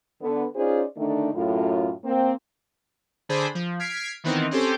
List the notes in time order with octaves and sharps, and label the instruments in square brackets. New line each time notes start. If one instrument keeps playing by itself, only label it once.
[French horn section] D3 B3
C#4 D#4 F4 G#4 C5 D5
D3 D#3 A3 D4 D#4
F#2 A2 F4
A#3 C4
[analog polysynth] D3 D4 G#4 C5 B5
F3
F6 G#6 B6 C7 D7
D#3 E3 B3 C4 D#4
C4 C#4 G4 A4 C5